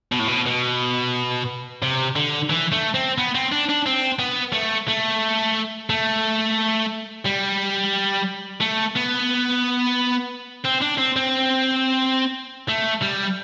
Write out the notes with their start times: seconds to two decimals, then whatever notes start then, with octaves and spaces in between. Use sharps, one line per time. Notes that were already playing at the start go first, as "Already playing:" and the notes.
0.12 B2
0.19 A2
0.28 B2
0.47 B2
1.82 C3
2.16 D3
2.50 E3
2.72 A3
2.95 C4
3.18 B3
3.35 C4
3.52 D4
3.69 D4
3.86 C4
4.19 B3
4.53 A3
4.88 A3
5.90 A3
7.26 G3
8.60 A3
8.96 B3
10.65 C4
10.82 D4
10.98 C4
11.16 C4
12.69 A3
13.02 G3